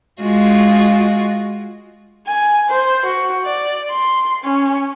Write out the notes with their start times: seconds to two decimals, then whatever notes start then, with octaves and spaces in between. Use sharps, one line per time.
0.22 G#3 F4 F#4
2.27 G#5
2.69 C5
3.05 F#4
3.46 D5
3.92 C6
4.44 C#4